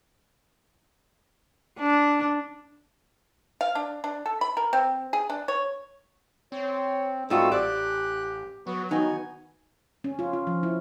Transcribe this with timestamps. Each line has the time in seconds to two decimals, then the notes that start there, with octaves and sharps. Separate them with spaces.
1.80 D4
3.61 F5
3.75 D4
4.04 D4
4.26 A4
4.41 B5
4.57 A#4
4.73 C4
5.13 G#4
5.30 D4
5.48 C#5
6.52 C4 C#5
7.30 G#2 G3 A3 C4 F4 F#4 E6
7.52 A1 G4 D5 F#6
8.67 F#3 B3 F#4
8.91 D#3 B3 D#4 F#4 G#5
10.04 C#4
10.19 F4
10.33 F4
10.47 F3
10.63 E4